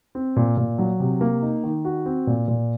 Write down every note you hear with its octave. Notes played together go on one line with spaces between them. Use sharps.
C4
A#2
A#2
F#3
C3
A#3
D#4
D#3
F#4
C4
A#2
A#2